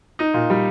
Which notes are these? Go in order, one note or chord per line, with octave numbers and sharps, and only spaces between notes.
D#4
A#2
G3